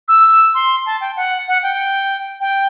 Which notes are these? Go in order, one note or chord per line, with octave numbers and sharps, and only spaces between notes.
E6
C6
A5
G5
F#5
F#5
G5
G5